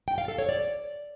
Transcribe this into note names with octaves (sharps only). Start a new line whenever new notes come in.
G5
F5
A4
C#5
D5